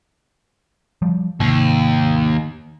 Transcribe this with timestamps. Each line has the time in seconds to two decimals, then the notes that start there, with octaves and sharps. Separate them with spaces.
1.02 F3 G3
1.40 D#2 G#2 C3 D#3